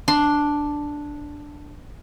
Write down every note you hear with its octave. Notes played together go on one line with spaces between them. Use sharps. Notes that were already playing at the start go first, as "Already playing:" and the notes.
D4 C6